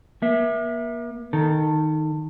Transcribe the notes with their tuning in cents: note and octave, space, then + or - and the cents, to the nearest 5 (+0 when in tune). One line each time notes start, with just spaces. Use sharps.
A#3 +40 E5 +0
D#3 +0 A4 +20